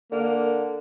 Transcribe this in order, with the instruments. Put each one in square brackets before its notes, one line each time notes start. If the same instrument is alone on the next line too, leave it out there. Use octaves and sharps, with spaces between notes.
[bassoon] D3 [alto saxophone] A#3